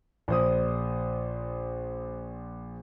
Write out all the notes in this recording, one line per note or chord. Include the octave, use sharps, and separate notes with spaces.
A#1 C5 D#6